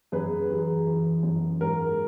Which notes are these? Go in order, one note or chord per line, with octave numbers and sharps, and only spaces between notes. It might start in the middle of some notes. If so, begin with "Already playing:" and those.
F#2 G#4 B4
E3 G#4
E3
F#2
G#2 A#4